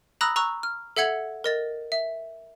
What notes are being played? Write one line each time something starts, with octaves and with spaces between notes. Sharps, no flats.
A#5 B5 D#6 E6 F#6 A#6
A#5 C#6 E6 F#6
F6
A4 E5 F#5 G#6 C#7 F#7
A#4 D#5 A6
E5